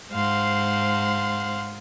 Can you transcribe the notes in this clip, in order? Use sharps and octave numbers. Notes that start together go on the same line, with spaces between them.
G#2 C5 F5 F#5 C6